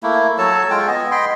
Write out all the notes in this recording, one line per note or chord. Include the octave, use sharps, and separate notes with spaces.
A3 A#3 E4
F#3 A4 C#5 A5
G#3 F4 G5
B3 D#5 G#5
D#5 G5 B5 C6